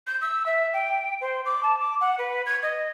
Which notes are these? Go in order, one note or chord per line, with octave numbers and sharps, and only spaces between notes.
G6
E6
E5
G5
C5
D6
A5
D6
F#5
B4
G#6
D#5